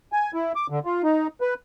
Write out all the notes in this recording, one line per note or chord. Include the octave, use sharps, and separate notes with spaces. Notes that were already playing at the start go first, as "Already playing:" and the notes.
G#5
E4
D6
D3
F4
D#4
B4